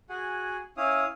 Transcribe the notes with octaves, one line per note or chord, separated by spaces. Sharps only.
F#4 G#4 F#5 G#5
C#4 E4 F5 D#6